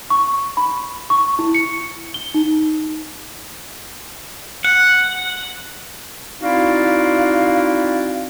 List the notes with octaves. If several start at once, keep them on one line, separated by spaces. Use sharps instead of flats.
C#6
B5
C#6
E4
C#7
G7
D#4
F#5
C4 D#4 E4 F#4 D5 F5